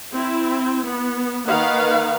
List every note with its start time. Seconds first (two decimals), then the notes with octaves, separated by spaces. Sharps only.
0.13 C4 E4
0.85 B3
1.46 D#3 A#3 D#4 B4 F5 F#5